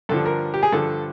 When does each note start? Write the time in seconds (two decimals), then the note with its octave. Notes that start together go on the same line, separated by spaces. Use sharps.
0.09 G2 D3 F3 A4
0.26 A#4
0.54 G4
0.63 G#4
0.72 G2 D3 F3 A4